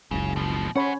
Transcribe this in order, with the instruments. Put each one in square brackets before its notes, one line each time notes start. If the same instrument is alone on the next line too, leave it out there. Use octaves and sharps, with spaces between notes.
[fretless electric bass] F#1 C#2 [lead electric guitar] C#3
[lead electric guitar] B2 F3
[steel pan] C#4 C#5 B5 [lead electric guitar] C5 F#5